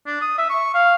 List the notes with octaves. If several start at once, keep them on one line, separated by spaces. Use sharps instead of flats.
D4
D#6
E5
C#6
F5